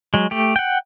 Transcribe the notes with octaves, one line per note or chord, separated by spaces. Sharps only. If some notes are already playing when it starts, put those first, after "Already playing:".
F#3 G#3
A3 G4
F#5 G5